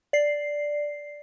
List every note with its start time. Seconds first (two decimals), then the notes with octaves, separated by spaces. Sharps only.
0.13 D5 C7